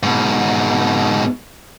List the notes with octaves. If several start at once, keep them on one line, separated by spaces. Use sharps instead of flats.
G#2 B2